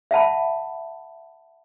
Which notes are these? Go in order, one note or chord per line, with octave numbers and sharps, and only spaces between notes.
E5 F#5 A5 B5